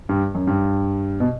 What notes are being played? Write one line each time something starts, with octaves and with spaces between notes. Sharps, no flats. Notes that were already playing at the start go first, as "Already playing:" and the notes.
G2
F#2
G2
B2